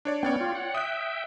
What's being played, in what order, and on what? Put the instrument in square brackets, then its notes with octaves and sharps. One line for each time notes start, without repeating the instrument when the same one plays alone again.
[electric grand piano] D4 C#5 D5
[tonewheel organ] B3 C#4 [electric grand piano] C#5 D5 G5
[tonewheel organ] F4
F#5
[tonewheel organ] E5 G5 [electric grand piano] D#6 F#6